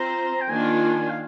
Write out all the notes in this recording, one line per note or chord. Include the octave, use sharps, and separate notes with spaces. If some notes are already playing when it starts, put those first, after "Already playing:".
Already playing: C4 F4 C5 A#5
G5
D#3 A#3 D4 F4 G#5
F5